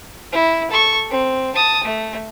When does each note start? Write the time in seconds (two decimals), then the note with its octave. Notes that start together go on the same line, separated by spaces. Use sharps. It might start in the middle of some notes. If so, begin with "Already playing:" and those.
0.32 E4
0.71 A4 C#6
1.10 C4
1.55 A5 D#6
1.84 A3